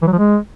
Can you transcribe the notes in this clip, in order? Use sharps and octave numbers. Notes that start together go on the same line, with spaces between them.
E3
F#3
F3
G#3